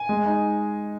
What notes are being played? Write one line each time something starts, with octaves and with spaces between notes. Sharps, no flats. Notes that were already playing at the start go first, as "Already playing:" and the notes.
Already playing: G#5
G#3
D#4